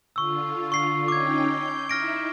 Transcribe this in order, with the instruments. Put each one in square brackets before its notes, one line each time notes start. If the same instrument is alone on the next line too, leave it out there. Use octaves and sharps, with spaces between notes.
[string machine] D3 F4 [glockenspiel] C#6 E6
[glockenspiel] C#6 C7
[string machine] C#4 D#4 G5 [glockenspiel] D6 G#6
[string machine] G6
[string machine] D#4 E4 E5 [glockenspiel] F6 A#6 D7